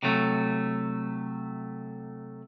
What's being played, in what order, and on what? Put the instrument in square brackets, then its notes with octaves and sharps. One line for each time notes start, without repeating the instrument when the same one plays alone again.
[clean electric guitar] C3 F#3 A3